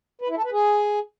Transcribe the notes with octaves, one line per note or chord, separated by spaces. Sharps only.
B4
E4
A4
B4
G#4